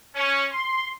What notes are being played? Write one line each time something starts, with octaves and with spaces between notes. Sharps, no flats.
C#4
C6